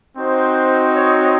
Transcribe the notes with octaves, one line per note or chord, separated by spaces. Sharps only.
C4 D#4 F#4 C5
C#5